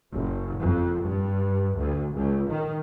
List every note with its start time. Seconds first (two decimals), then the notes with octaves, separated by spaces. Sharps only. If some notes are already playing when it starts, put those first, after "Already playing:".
0.12 F#1
0.62 F2
1.05 G2
1.77 D2
2.14 C#2
2.50 D#3